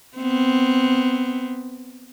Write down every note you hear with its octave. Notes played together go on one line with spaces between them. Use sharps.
B3 C4